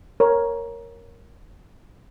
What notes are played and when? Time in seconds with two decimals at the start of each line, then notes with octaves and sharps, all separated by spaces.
0.20 A#4 C#5